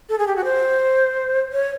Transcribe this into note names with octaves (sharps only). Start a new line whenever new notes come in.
A4
G#4
G4
F#4
C5
C#5